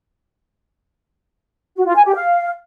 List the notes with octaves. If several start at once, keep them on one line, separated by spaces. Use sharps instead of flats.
F#4
F4
G#5
G4
F5